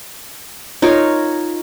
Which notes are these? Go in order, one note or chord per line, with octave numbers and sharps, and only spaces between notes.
D#4 F4 A#4 C#5